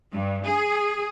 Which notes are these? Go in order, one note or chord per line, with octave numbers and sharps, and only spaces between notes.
G2
G#4